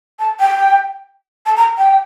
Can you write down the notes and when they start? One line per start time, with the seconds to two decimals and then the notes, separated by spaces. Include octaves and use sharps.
0.19 A5
0.40 G5
1.46 A5
1.56 A#5
1.78 G5